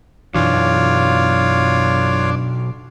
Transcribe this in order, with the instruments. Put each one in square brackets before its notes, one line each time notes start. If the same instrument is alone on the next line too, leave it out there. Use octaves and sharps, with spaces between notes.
[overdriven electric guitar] B1 [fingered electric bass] F#2 E3 F#3 [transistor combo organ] D4 [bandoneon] F4 C#5 F5